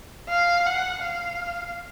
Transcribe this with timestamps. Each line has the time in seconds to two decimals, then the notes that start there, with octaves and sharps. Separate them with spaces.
0.29 F5
0.66 F#5
1.04 F5